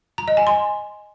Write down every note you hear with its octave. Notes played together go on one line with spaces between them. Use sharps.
A#5
D#5
G#5
C6